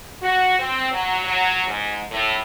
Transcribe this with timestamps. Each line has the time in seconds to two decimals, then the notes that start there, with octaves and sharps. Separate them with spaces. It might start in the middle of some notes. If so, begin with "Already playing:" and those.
0.22 F#4
0.58 C4
0.91 F#3
1.24 F#3
1.66 G#2
2.11 A2